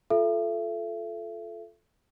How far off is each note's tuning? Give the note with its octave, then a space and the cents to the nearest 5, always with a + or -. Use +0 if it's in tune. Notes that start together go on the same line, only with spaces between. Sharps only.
F4 +0 A4 -5 E5 +35